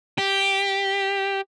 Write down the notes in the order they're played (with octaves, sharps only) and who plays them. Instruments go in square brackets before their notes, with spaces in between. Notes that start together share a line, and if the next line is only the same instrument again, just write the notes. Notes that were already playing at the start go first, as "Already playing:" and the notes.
[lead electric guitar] G4